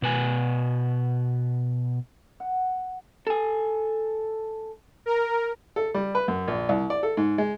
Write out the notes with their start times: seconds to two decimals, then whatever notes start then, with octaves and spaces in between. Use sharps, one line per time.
0.02 B2 B4 G#5
2.40 F#5
3.27 A4 G#5
5.06 A#4
5.76 A4
5.94 G3
6.15 B4
6.28 F#2
6.48 A#1
6.69 C2
6.90 D5
7.03 A4
7.17 G#2
7.38 G#3